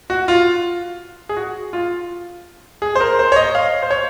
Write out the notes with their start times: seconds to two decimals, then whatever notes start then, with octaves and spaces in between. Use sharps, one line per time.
0.10 F#4
0.28 F4
1.29 G#4
1.37 F#4
1.73 F4
2.82 G#4
2.95 C5
3.01 A#4
3.19 C5
3.32 C#5
3.36 D#5
3.55 F5
3.82 C5
3.91 C#5